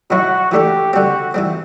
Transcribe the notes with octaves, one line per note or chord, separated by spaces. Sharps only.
B2 F#3 B3 E4 F#4
E3 A3 D4 G4 A4
D3 G3 C4 F#4
E3 G3 C4